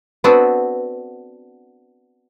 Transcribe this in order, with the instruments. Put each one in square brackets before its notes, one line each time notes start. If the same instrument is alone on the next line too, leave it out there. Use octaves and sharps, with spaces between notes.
[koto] B3 C4 D4 F#4 A4 B4